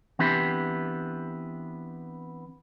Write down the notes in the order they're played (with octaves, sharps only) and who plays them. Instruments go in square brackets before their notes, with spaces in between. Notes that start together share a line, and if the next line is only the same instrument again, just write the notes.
[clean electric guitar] E3 B3 C4 D4 E4 G4